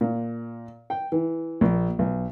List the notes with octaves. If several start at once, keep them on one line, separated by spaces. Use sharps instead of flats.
A#2
G5
E3
A#1
B1